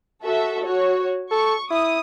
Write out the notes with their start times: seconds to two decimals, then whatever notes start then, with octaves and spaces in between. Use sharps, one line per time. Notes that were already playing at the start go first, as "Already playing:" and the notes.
0.25 F#4 A4 E5
0.64 F#4 C#5
1.31 A4 C#6
1.71 E4 D#6